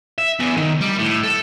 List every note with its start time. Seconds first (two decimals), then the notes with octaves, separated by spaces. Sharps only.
0.18 E5
0.39 E2
0.57 D#3
0.81 G3
0.99 A2
1.23 A4